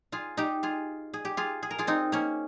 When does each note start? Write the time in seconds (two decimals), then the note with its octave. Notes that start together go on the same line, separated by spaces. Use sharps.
0.12 F4 G#4
0.37 D#4 G4
0.63 F4 G#4
1.13 G#4
1.25 G4
1.37 F4 G#4
1.63 G#4
1.71 A#4
1.78 F4 G#4
1.87 C4 D#4
2.12 A#3 C#4